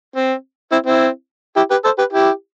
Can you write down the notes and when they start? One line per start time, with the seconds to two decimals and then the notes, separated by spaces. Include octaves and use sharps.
0.16 C4
0.72 C4 E4
0.86 C4 E4
1.56 E4 G4
1.71 G4 B4
1.84 A4 C5
1.98 G4 B4
2.13 E4 G4